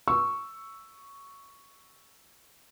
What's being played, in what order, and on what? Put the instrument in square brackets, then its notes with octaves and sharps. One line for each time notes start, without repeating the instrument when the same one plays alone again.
[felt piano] C#6 E6